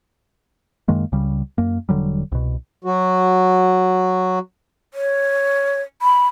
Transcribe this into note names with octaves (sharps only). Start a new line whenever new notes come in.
F#2 D#3 G#3 A#3
C#2 C#3 G3
F#2 A#3
E1 D3 F#3 G3
C2 B2
F#3 F#4
C#5
B5